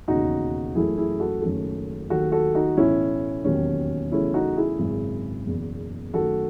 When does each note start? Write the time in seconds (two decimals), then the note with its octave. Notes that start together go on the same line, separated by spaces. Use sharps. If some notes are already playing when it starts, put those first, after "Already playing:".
0.08 E1 D#2 C#3 D#4 F#4
0.75 F#1 F#2 E3 A3 E4 G#4
0.98 E4 G#4
1.20 F#4 A4
1.42 F#1 F#2 D#3 A3
2.10 D#2 D#3 F#3 A3 F#4 A4
2.32 F#4 A4
2.55 D#4 F#4
2.77 B1 A2 E3 A3 C#4 E4
3.44 E1 D#2 D#3 F#3 C#4
4.12 E2 C#3 F#3 A3 C#4 E4
4.34 D#4 F#4
4.56 E4 G#4
4.79 G#1 F#2 C#3 G#3
5.46 F#1 E2 B2
6.14 F#2 D#3 A3 F#4 A4